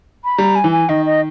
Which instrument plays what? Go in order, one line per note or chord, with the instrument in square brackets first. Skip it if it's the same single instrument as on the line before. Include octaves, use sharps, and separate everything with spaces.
[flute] B5
[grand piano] G3 [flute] A#5
[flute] G#5
[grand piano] E3
[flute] G#5
[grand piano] D#3 [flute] D#5
[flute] D#5